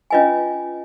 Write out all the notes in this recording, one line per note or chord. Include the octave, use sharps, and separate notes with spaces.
C#4 F4 B4 D#5 G#5